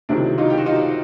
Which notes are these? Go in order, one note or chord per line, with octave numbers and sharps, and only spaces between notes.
C#2 C3 D#3 F#3 D4 E4
D#4 F4
G4
F#4
D#4 F4